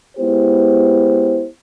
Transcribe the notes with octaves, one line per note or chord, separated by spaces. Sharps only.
G#3 B3 E4 G4 C5